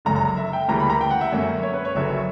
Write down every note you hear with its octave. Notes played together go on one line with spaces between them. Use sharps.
F#1 F#2 D3 A#5
A#5
E5
G5
D2 C#3 E3 G3 A#3 A#5
B5
A#5
G5
F#5
E5
F#2 D3 A#3 C#4
C#5
B4
C#5
F#1 F#2 D3 F#3 E5